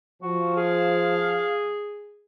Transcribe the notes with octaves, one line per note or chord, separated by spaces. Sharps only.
F3 F#4
G#4 F5